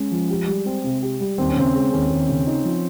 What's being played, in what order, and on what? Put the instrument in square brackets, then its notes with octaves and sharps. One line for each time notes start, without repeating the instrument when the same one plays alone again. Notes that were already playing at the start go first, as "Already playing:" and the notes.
Already playing: [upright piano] G#3 [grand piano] C#4
[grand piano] F3
G4
G3
C4
C3
G4
G3
[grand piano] D#2 [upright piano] C4
[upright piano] C#4
[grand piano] C#3 [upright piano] C4
[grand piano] G#3
[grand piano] D#2 [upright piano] C#4
[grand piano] D#2
C#3
D#4
F3